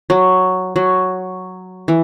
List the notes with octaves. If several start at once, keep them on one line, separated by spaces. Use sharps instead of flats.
F#3
F#3
E3